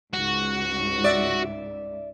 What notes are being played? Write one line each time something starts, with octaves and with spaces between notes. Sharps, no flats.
C#2 G#2 F#4
D5 E5